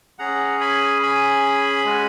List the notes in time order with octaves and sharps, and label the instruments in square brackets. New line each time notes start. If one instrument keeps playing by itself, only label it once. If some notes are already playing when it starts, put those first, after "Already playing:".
[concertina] C#4 G#4 F#5 A#5
G#5 B5
G#5 B5
G#3 C#4 F#4